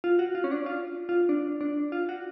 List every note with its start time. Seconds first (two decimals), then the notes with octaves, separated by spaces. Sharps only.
0.04 F4
0.19 F#4
0.35 F4
0.44 C#4
0.51 D4
0.66 F4
1.09 F4
1.29 D4
1.61 D4
1.92 F4
2.09 F#4